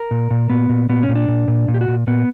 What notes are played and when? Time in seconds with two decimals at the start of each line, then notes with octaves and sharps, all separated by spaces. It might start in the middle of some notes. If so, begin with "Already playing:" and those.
Already playing: A#4
0.11 A#2
0.31 A#2
0.50 A#2 B3
0.69 A#2
0.89 A#2 B3
1.03 C#4
1.09 A#2
1.15 D4
1.28 A#2
1.48 A#2
1.68 A#2
1.74 G4
1.81 F#4
1.88 A#2
2.07 A#2 B3